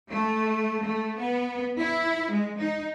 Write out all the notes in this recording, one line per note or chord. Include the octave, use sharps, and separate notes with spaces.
A3
A3
B3
E4
G#3
D#4